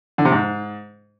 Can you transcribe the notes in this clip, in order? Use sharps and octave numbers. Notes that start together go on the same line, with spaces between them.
D3
C3
G#2